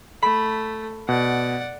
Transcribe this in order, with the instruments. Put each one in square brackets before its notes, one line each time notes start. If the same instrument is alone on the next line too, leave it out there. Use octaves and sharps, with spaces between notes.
[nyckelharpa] A3 [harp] B5
[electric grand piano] B2 [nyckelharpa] D5 F#5